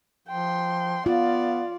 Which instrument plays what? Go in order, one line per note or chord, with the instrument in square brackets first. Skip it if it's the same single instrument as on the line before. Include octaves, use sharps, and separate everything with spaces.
[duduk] F3 [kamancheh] G5 C6
[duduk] B3 [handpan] F4 [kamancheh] D5 F5